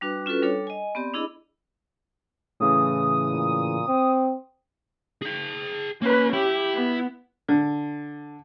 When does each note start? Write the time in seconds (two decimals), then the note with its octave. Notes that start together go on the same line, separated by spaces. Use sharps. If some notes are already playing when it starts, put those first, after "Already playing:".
0.01 G3 D4 F#4 B4
0.26 C#4 F4 F#4 A4 B4
0.42 G3 D4 A4 C#5
0.67 D#5 G#5
0.95 B3 C4 G4 D5
1.14 D4 E4 G#4 D#5 B5 E6
2.60 A2 C#3 E3 D#6
3.31 A#2
3.88 C4
5.22 G#4 G5
6.02 A#3 C#4 B4
6.33 E4 G4
6.73 B3
7.48 D3